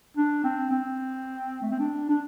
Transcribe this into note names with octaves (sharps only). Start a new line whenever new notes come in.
D4
C4
C4
A3
C4
D4
D4